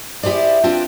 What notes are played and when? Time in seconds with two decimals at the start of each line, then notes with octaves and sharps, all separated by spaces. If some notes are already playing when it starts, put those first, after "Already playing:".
0.23 E4 G4 G#4 C5 D5
0.64 C4 D4 F4 G4 B4 C5